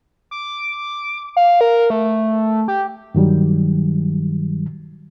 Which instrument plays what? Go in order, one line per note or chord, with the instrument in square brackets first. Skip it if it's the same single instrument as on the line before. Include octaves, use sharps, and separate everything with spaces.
[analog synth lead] D6
F5
A#4
A3
A3
G4
[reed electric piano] G2 D#3 F#3 G3